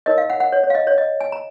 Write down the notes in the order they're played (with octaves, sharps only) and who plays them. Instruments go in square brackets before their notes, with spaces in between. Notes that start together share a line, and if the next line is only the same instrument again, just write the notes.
[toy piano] D#4 A#4 C#5 D#5
F5
F#5
F#5
C#5
C#5
F5
D#5
C#5
D#5
G#5
A#5